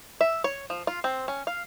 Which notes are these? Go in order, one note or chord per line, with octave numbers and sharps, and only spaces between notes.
E5
C#5
F3
F4
C4
C#4
F5